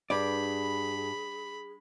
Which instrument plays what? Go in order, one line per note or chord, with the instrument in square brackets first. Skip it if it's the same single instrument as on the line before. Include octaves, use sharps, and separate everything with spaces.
[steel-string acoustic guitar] G2 [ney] G#4 [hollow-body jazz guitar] D5 [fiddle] B5